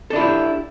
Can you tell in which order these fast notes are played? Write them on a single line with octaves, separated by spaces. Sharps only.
A4 D4 E4 F4 G4